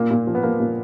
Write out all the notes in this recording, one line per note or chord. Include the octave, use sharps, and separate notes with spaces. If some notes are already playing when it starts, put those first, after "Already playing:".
Already playing: A#2 A#3
A#2
F3
B3
F3 A#3
A#2